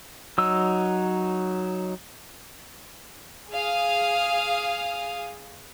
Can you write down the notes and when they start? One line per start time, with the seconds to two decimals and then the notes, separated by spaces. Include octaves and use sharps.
0.38 F#3 D#4 E6
3.50 G#4 F5 D#6